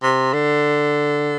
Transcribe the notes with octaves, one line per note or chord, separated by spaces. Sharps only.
C3
D3